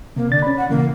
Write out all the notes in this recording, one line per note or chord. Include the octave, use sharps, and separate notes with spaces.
C3 A#3
D3 D4 A6
C#4 B5
F#5
A#2 C#3 E3 A#3